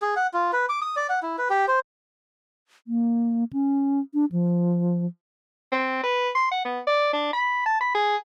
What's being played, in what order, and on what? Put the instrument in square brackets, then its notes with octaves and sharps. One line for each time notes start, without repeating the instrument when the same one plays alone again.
[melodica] G#4
F#5
F4
B4
D6
D#6
D5
F#5
E4
B4
G4
C5
[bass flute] A#3
C#4
D4
F3
[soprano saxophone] C4
B4
C6
F#5
B3
D5
D4
B5
A5
B5
G#4